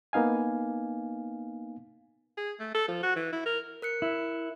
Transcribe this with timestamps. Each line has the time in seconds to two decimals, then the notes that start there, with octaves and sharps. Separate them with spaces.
0.13 A#3 B3 D#4 F5 G#5
2.37 G#4
2.60 A3
2.74 A4
2.88 F3
3.03 F#4
3.16 E3
3.32 E4
3.45 A#4
3.82 A#4 F#6 C#7
4.02 E4